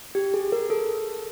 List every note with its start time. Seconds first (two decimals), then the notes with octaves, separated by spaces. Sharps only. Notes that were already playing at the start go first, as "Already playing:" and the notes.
0.15 G4
0.34 G#4
0.52 A#4
0.70 A4